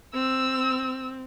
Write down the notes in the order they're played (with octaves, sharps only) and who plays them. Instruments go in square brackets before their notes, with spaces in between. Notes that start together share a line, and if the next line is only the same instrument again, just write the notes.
[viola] C4 [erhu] E6